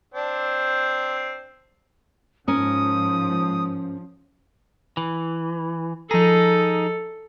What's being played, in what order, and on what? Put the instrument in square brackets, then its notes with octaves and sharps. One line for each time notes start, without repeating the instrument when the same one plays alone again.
[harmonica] C4 D4
[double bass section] G#2 F3 [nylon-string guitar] C#4 A#4 [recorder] D#6
[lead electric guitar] E3
[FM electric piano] F3 A#5 [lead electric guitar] D#4 G#4 [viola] A4